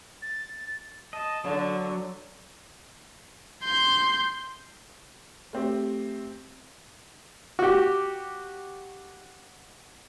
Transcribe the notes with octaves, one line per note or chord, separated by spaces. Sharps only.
A6
D#5 A5
D3 F#3
C6 G6
A3 C4 G4
F#4 G4